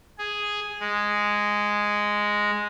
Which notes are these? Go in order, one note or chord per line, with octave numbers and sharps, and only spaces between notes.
G#4
G#3